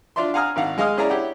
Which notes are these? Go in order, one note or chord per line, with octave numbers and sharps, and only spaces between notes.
D4 F4 D5 E5 C6
F5 F#5 G#5 A#5 D#6 F6
G#1 D#3 F5 F#5
G#3 D#5 F5 G#5 D#6 F6
C#4 E4 G#4 D5 E5 A#5
E4 G4 C#5 F#5